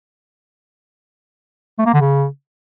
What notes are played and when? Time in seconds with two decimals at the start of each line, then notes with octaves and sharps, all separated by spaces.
1.79 A3
1.86 A#3
1.94 D3
2.01 C#3